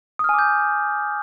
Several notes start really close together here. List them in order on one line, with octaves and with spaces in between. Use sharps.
D#6 F6 G#5 D6 G6